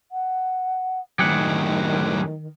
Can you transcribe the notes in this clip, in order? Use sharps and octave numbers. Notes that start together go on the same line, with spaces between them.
F#5
F#2 A2 D#3 G4 G#4 F#5